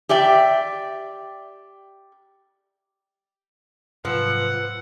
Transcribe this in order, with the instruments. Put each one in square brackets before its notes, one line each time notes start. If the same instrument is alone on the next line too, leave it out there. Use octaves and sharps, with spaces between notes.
[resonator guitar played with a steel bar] G4 D5 E5 G5
[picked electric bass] G#2 C3 F#3 [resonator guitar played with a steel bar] F3 [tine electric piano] B4 E6 [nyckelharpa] F#5